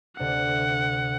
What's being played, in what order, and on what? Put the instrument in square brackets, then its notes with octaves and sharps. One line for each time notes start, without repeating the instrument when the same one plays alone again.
[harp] D2 C3 D4 [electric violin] F#5